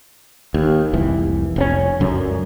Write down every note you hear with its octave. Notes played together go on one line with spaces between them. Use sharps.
D#2
F1 C2 E3
F1 C4 C#4
C#2 F#2 D3